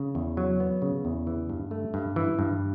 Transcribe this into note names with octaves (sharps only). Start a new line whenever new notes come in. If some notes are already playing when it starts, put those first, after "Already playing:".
Already playing: C#3
E2
F#3
B3
C#3
E2
E3
G2
A3
G2
E3
G2